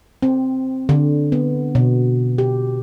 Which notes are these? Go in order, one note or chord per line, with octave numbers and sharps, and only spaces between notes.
C4
D3
B3
B2
G4